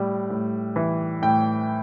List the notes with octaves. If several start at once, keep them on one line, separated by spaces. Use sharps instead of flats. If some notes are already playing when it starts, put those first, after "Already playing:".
Already playing: A2 G3
A2
E3
A2 G5